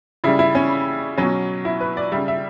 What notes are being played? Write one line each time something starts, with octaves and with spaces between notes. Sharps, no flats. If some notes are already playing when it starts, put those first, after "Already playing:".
C#3 G3 E4
E4
C#4
B2 F#3 C#4
E4
B4
D5
C#3 G3 E5
E5